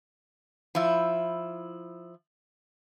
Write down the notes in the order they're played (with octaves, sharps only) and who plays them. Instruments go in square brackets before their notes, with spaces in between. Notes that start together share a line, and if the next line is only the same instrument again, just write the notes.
[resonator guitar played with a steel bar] F3 E4